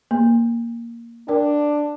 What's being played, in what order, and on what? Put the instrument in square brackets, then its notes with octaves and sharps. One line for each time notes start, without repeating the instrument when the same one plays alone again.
[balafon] A#3
[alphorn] D4 [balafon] A#4 D5 G5